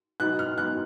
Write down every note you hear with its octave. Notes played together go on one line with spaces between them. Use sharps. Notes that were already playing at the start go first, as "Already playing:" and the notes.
B2 F#3 B3 D#4 F#6
F6
B2 F#3 B3 D#4 F#6